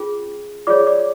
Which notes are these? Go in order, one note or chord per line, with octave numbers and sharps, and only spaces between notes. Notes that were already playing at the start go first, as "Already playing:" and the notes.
Already playing: C#4 F4 G#4
F4 G#4 C#5 D5 D6
D5 D6